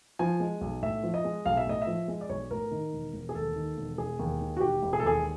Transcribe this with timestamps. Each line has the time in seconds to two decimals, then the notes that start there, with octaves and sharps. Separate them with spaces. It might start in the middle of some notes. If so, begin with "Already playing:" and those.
0.19 F3 G#5
0.40 G#3
0.61 B1
0.82 A2 E5
1.03 F3
1.14 D#5
1.24 G#3
1.45 B1 F5
1.57 E5
1.67 A2 D#5
1.82 E5
1.87 F3
2.08 G#3
2.21 D5
2.29 B1 C#5
2.50 A2 A#4
2.71 D#3
2.93 E1
3.13 E1
3.29 G#4
3.35 D#2 A4
3.56 D#3
3.77 E1
3.98 E1 G#4
4.19 D#2
4.40 D#3
4.57 F#4
4.60 E1 G4
4.82 E1
4.93 G#4
5.00 A4
5.03 D#2 G#4